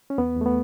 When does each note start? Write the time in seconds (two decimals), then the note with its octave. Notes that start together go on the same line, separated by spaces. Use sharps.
0.10 C#4
0.18 E2 B3
0.36 E2 A3
0.46 B3